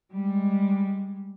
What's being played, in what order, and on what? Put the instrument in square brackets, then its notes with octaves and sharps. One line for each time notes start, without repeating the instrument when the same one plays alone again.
[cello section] G3 G#3